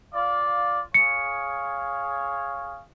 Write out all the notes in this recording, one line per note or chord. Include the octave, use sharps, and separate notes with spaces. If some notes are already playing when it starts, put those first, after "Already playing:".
F4 D5 F5
G#4 C#5 F5 C#7